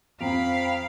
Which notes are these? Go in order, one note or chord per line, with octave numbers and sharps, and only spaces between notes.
F2 C4 F5 G5 A#5 B5 B6